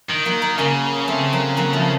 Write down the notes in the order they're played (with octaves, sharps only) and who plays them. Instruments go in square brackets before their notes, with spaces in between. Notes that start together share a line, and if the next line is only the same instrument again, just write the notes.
[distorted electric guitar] D#3
[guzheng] F#3 A#3
F#3 A#3
[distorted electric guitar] C#3 [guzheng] A#3 C#4
[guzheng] A3 C4
F#3 A#3
F#3 A#3
F3 A3